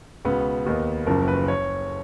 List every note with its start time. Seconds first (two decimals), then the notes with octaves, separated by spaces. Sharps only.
0.25 C#2 B2 B3
0.66 D#2 D#3
1.06 F#1 F#2 F3 A#4
1.28 B4
1.48 C#5